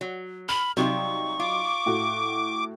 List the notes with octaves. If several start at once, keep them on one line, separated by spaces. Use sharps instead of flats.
F#3
B5 F6
C3 F#3 G3 D#4 F4 C#6
F4 D6
A2 F#4